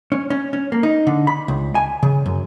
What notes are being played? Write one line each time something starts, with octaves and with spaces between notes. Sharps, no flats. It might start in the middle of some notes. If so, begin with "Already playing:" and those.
C#4
C#4
C#4
A#3
D#4
D3
B5
C#2
G#5
C#3
F#2